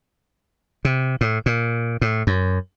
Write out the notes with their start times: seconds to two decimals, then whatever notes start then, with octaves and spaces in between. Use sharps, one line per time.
0.85 C3
1.21 A2
1.46 A#2
2.01 A2
2.27 F#2